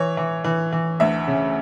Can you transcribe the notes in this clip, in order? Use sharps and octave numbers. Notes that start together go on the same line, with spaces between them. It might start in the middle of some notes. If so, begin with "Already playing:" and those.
Already playing: E3 C#5
E3
E3
E3
D2 E5
C#3